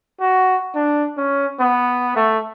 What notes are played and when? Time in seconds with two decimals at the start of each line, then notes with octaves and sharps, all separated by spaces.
0.20 F#4
0.75 D4
1.17 C#4
1.60 B3
2.16 A3